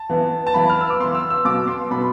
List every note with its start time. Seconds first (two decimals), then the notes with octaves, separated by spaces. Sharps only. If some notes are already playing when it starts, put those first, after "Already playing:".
Already playing: A5
0.09 E3 B3
0.47 A5
0.54 E3 B3 B5
0.70 F6
0.81 E6
0.90 D6
1.00 E3 B3 C6
1.15 E6
1.30 E6
1.45 B2 B3 D6
1.68 C6
1.91 B2 B3 B5